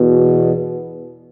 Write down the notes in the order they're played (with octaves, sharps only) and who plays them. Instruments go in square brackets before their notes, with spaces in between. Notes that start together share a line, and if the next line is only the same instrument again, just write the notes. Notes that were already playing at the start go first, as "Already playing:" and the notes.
Already playing: [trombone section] E2 B2